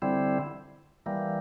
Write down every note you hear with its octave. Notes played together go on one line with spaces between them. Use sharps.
D3 G3 C4 E4
E3 G3 A#3